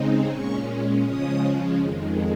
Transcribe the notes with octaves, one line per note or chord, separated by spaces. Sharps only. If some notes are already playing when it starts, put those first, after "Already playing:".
Already playing: C#3 G#3 C4 D#4
A#2 G#3 C#4 C#6
C#3 F3 G#3 C#4 D#6
F2 D#3 G#3